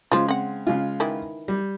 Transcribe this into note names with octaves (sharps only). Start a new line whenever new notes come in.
C#3 F3 G#3 F4
C4 F#5
C#3 G#3 F4
D#3 E3 E4
G3